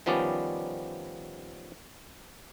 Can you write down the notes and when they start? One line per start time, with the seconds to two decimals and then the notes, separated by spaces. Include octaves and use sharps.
0.06 D#3 F3 G3 B3 C#4 D5